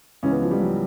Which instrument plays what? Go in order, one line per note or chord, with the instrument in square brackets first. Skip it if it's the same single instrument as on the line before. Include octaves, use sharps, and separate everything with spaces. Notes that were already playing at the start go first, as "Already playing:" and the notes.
[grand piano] C#2 C#3 E3 C#4
B3
F3
G3
F#3